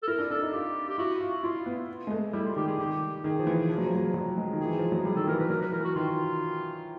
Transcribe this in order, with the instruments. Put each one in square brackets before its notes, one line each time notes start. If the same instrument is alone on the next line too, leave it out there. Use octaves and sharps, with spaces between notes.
[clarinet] A4
[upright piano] E4 [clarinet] A#4
[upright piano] D4
[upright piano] D4 [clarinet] A4
[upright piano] D#4
[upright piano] F4 [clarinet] G4
[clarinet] G4
[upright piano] E4 [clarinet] F#4
[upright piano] F4
[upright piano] E4 [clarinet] F4
[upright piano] B3
G#3
A3
[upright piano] G3 [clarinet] E4
[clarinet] F4
[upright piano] D#3 [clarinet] G4
[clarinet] G#4
[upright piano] D#3 [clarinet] G4
[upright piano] D#3 [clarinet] G#4
[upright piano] F3
E3
F3
F#3
F3
F#3
F3
F#3
G#3
D#3
[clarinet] G#4
[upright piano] E3
F3
F#3
[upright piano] G3 [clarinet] G#4
[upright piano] D#3 [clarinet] A4
[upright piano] E3 [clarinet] A#4
[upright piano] F3 [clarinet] B4
[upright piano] F#3 [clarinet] A#4
[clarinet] B4
[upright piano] E3 [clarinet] A#4
[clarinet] F#4
[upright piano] D#3 [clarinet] F4